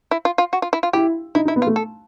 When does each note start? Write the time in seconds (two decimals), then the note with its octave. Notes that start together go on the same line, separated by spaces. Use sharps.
0.11 E4
0.25 F4
0.38 F4
0.53 F#4
0.62 F4
0.73 E4
0.83 F4
0.93 E4 G4
1.35 D#4 E4
1.45 D#4
1.48 E4
1.56 B3
1.62 F4
1.67 A3
1.76 A4